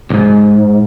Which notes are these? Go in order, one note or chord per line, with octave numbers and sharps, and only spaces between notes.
C2 G#2